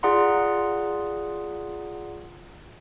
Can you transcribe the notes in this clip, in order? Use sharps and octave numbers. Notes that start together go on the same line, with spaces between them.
F4 G#4 D5 F#5 A#5 C6